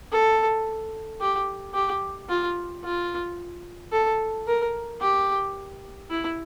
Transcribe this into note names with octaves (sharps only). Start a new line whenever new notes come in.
A4
G4
G4
F4
F4
A4
A#4
G4
E4